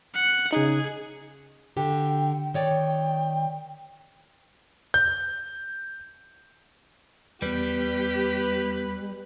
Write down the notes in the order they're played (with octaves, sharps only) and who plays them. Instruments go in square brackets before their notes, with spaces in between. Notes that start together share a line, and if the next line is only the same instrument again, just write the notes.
[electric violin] F#5
[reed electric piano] C#3 D#4 [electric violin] G#4
[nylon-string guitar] D3 G4 [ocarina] G5
[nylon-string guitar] D#3 C#5 D5 [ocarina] G5
[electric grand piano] G6
[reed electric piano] E2 B3 [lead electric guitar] G3 [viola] G4 [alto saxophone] B4